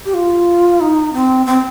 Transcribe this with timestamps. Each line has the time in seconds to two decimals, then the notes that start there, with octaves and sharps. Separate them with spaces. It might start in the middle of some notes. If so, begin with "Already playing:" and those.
0.06 G4
0.14 F4
0.81 D#4
1.13 C4
1.46 C4